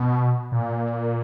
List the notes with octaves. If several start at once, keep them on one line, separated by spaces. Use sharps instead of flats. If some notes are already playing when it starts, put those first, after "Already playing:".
Already playing: B2
A#2